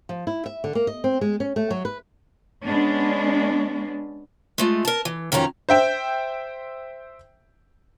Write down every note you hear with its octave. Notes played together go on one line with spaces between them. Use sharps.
F3
E4
E5
D3
A#3
D#5
C4
G#3
C#4
A3
F#3
B4
G#3 B3 C#4 D4
G#3 A3 F4
A#4 A5
E3
F2 D#3 F#3 C#4 A#5
C5 E5 G5